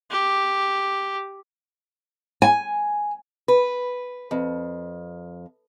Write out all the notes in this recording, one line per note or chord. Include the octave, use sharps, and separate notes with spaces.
G4
G#5
B4
F2